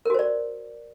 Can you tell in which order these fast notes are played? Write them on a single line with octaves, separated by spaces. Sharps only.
A#4 F#4 C5 D5